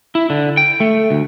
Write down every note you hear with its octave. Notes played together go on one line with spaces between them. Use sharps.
E4
D3
G5
A3
D2